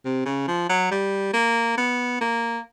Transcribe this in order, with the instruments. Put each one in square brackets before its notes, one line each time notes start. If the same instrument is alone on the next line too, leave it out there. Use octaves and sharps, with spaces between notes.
[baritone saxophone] C3
C#3
F3
F#3
G3
A#3
B3
A#3